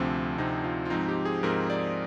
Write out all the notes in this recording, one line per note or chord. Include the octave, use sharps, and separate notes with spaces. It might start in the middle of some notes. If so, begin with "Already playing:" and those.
Already playing: D2 C3 F3 C4 D4
D2 C3 F3 C4 D#4
F4
F4
G#2 F3 C4 D#4
G4
G#4
G#2 F3 C4 A#4
D5